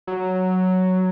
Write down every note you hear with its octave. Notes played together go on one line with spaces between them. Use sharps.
F#3